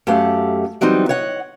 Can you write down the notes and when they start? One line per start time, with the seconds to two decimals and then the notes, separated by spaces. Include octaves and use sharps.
0.07 F#2 A3 G4 F5 F#5
0.81 E3 F#3 G3 C4 D#4
1.09 C#5 D#5 F#5